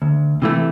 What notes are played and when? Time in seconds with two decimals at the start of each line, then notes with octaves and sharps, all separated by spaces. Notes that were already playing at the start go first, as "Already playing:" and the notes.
0.02 D2
0.42 C3 E3 A3